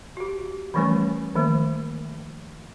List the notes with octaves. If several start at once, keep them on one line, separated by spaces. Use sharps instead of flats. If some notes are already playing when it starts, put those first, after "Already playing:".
F#4 G4
E3 F3 G3 A3 C#4 B4
D#3 F3 A3 A#3